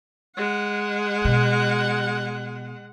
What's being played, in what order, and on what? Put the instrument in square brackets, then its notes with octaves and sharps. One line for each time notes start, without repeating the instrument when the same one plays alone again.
[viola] G#3 F#5
[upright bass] B2